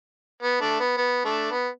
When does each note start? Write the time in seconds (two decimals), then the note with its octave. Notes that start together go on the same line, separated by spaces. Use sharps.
0.43 B3
0.61 A3 D4
0.80 B3
0.97 B3
1.25 A3 D4
1.52 B3